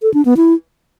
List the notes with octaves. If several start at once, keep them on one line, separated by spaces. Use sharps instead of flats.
A4
D4
B3
E4